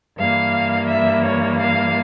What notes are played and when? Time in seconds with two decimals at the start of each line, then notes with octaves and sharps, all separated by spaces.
0.17 G2 E3 A#3 F5
0.88 E5
1.24 C#5
1.59 F5